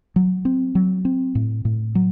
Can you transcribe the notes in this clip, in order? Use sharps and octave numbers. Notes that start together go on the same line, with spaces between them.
F#3
C4
F#3
C4
A2
A2
F#3